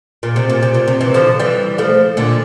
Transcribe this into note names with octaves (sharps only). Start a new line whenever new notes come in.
A#2
C3
A#2
C3
A#2
C3
C3 E3
D3 F3
E3 G3
F3 A3
A#2 D3